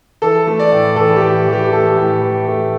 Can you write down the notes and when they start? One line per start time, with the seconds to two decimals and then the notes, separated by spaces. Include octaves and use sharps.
0.22 E3 A4
0.47 A3
0.59 D5
0.72 A2
0.96 E3 A4
1.16 G4
1.22 A2
1.47 E3
1.53 G4
1.72 A3 A4
1.97 A2
2.21 E3
2.47 A3